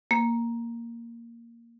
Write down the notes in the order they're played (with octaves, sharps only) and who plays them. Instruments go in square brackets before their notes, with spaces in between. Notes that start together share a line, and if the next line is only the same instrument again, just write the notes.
[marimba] A#3